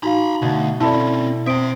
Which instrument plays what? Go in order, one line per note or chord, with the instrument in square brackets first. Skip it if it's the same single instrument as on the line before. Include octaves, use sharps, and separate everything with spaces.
[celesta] D#4 F#4 F5 [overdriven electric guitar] A#5 B5
[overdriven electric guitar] D2 [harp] B2
[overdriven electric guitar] C4 C#4 [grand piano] E4 A4 D5 [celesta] A5 B5
[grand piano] C4 [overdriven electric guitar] E5 G5 [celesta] D#6 D7